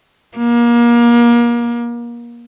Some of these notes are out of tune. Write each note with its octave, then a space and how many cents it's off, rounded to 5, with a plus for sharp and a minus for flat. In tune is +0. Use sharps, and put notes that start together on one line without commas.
A#3 +30